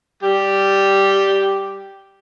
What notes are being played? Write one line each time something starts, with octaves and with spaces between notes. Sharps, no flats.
G3 G4